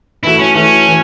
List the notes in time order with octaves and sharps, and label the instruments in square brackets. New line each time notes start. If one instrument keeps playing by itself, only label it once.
[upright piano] E3 A3 F#4 [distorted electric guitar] E4
[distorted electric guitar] C#4
[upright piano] E3 A3 F#4 [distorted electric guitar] C#4
[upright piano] E3